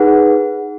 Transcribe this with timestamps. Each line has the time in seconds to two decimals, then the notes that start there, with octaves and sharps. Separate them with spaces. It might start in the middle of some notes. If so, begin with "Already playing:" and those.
Already playing: D#4 G#4 B4 F#5